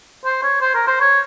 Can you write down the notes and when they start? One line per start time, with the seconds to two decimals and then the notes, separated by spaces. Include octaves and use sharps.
0.25 C5
0.43 C#5
0.61 C5
0.74 A#4
0.87 C5
1.00 C#5